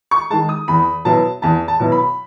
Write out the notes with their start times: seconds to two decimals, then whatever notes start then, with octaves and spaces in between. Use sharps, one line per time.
0.11 C#6
0.31 D#3 G#3 A5
0.49 D#6
0.68 E2 B5
1.05 B2 F#3 B3 E4 A5
1.42 E2 A5
1.68 A5
1.80 B2 F#3 B3 E4
1.92 B5